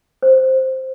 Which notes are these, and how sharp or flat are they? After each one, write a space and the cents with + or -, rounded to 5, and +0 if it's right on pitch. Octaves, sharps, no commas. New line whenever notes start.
C5 +0